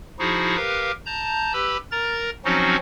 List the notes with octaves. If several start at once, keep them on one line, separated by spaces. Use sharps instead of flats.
F3 D#4 E4 F#4 G#4
G4 A#4 B4 F5
A5 A#5 G6
G4 B4 B5 E6
A#4 A#5 A6
F3 F#3 C4 C#4 D#4 F#4